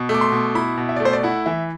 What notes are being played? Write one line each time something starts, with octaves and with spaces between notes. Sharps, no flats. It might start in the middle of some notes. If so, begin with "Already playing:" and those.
Already playing: B2
A3
D6
C6
B2
E4 B5
B2
E5
D5
A3
C5
D5
E4 F#5
E3 E5